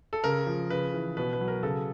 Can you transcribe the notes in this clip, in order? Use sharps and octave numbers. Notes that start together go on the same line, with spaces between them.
A4
C#3 A#4
F3
C#3 B4
E3
B2 B4
B4
F#3
A#4
C#3 A4